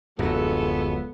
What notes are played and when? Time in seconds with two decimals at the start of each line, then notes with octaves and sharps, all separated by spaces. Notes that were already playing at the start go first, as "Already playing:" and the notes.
0.19 D1 F#2 F3 F#3 G#3 B3 A4